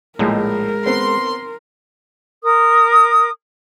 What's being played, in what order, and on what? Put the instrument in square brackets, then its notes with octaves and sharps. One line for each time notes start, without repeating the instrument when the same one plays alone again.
[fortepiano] A#1 A2 [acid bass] G#3 [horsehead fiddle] A#4
[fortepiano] B3 C4 [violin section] C6
[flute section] A#4 D#6